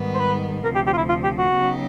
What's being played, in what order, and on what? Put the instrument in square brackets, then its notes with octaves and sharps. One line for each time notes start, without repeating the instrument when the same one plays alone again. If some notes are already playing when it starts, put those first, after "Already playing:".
Already playing: [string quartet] G#2 D#3 G3 B3
[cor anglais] C5
B4
[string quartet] D2 C3 F3 [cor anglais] A#4
[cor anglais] G4
G4
F4
E4
F4
G4
F#4
[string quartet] C#3 F#3 B3 D#4 G4